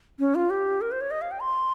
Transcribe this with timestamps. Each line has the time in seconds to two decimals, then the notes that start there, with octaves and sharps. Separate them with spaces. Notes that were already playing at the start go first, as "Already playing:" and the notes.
0.19 C#4
0.35 F4
0.50 G4
0.81 A#4
0.91 C5
1.01 C#5
1.11 D#5
1.22 F5
1.31 G5
1.41 C6